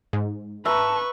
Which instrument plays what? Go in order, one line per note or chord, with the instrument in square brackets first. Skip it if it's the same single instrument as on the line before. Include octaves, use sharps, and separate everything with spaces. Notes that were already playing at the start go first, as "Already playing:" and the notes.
[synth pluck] G#2
[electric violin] B4 C#6 [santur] E5 A#5 [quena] A5